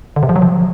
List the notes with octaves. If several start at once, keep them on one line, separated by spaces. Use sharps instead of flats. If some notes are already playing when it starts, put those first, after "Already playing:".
D3
C3
F3
F#3
F3